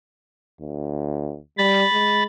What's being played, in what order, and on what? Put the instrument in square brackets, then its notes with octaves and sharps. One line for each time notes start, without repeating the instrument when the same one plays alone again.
[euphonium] D2
[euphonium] G3 [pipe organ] B5 A6
[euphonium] G#3